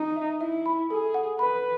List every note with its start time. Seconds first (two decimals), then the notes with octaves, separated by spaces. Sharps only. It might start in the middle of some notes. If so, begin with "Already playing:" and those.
Already playing: D#4
0.16 E5
0.41 E4 E5
0.66 B5
0.90 G#4 A4
1.14 F#5
1.39 B4 B5